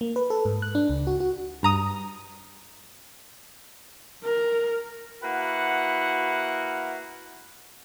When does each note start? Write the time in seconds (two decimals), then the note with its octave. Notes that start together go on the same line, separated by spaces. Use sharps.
0.01 A#3
0.16 B4
0.30 A4
0.45 G#2
0.62 F#6
0.75 D4
0.89 C#2
1.07 F#4
1.20 F#4
1.63 G2 A#5 D#6
4.24 A#4
5.23 A#3 E4 F#4 B4 F#5